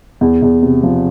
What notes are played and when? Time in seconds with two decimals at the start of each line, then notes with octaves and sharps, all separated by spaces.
0.21 E2
0.42 E2
0.63 C3
0.83 F3